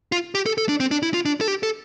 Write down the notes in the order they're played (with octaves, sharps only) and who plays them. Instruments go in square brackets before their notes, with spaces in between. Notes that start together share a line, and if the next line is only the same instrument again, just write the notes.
[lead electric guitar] F4
G4
A4
A4
D4
C4
D4
E4
F4
D4
A4
G4
A4